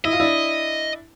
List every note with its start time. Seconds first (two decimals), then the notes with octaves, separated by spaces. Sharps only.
0.05 E4 D#5
0.13 F4
0.20 D4 E4